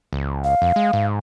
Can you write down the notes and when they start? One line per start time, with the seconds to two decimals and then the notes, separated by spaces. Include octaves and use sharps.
0.13 C#2
0.44 F5
0.62 F2
0.76 G#3
0.93 G#2